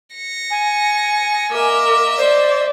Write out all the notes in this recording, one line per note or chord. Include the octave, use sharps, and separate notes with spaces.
A#6 C#7
G#5
A#3 A#4 D#5 E5 D6
C5 D5